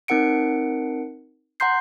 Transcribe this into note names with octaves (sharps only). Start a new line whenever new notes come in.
C4 D#4 A#4 F#5 C#7 D7
F#5 A#5 C6 G6 C7